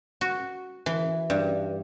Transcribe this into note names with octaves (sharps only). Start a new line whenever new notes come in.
F#4
E3
G2